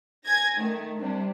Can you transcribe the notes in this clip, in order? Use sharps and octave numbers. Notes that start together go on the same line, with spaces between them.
G#5 G#6 A#6
D#3 A3
C3 G3 D4